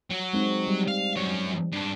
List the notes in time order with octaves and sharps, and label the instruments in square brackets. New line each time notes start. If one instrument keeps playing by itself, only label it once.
[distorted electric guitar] F#3
[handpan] G#3 C4 D#4
G3
[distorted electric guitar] F5
F#2 C#5
G2 D4